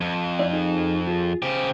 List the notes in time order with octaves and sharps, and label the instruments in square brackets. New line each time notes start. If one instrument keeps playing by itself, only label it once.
[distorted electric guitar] F2
[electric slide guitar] E4 D5
D#4 G#4 A4
F4 G#4
[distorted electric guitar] C#3 G4 [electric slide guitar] C5